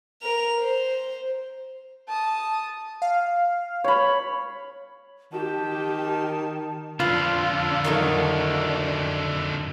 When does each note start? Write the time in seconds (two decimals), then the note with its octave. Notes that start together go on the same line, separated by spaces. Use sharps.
0.23 A#4 F7
0.61 C5
2.08 A5 D#6
3.02 F5
3.84 C#5 B5
5.32 D#3 G4 G5 A5
7.00 F2 D3 D4 F4 B4
7.84 D#3 F#3 A3